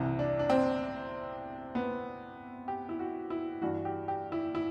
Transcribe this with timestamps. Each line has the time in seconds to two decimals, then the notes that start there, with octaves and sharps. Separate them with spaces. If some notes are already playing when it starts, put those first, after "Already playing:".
Already playing: C2 C3 E3
0.19 D4
0.39 D4
0.50 C4
1.75 B3
2.68 G4
2.89 E4
2.99 F#4
3.30 E4
3.61 G2 E3 F#4
3.85 G4
4.08 G4
4.32 E4
4.55 E4